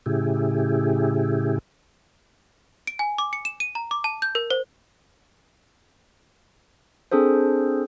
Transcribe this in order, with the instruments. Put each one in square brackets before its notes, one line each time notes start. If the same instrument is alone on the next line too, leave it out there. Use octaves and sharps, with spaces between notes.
[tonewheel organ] A2 C#3 E4 G4 G#4
[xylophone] D7
G#5
D6
C#7
E7
D#7
A#5
D6
A5
G6
A#4
C5
[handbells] C4 D4 G#4 A4 C5